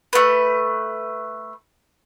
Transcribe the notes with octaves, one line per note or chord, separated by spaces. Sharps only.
A3 B4